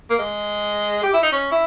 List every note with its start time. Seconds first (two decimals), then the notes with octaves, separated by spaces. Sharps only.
0.10 A#3
0.19 G#3
1.03 G4
1.14 E4
1.23 D#4
1.32 C#4
1.51 E4